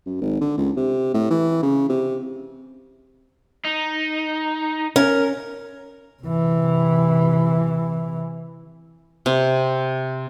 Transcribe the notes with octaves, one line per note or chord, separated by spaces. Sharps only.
F#2
G#1
D3
C#2
C3
A2
E3
C#3
C3
D#4
C#4 A#4
C3 E3
C3